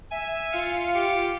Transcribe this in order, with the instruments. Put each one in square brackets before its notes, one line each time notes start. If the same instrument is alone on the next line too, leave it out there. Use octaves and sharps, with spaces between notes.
[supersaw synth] E5 [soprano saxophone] G#5
[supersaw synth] F4 F5 C#7
[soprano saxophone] G4